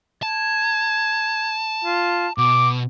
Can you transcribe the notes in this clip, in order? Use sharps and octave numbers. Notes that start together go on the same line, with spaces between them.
A5 G#6
F4
B2 D6